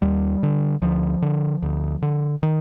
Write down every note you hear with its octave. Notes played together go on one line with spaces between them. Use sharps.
D#2 G3
D3
D2 F3
D3
D2
D3
D#3